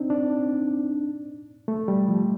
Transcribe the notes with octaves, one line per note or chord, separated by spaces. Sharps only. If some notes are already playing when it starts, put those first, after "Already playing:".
Already playing: C4 D4 D#4
D4
A3
G3
F3